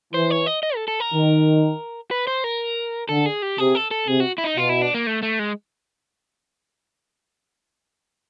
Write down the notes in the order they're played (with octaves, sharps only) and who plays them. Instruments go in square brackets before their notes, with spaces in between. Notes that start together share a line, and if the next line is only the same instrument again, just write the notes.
[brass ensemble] E3 [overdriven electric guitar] C5
[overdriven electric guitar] C#5
D#5
D#5
A4
A4
A#4
[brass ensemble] D#3
[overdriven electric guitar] B4
C5
A#4
[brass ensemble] D3 [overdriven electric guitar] A4
[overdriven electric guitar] G#4
G4
[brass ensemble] C3 [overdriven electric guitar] G#4
[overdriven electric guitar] A4
A4
[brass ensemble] C3 [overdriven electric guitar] G#4
[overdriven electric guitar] F#4
E4
D#4
[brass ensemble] B2 [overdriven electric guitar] F4
[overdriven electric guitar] E4
D4
A#3
A3
A3
G#3